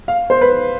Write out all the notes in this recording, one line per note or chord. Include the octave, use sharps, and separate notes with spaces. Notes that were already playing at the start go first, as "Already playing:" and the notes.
F5
C5
B4